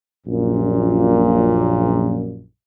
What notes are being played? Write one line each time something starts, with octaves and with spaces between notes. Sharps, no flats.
A#1 F#2 A#2